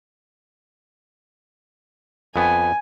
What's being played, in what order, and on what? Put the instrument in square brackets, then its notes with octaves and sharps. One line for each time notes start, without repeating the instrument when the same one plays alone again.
[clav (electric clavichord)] F2 B3 [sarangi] G#5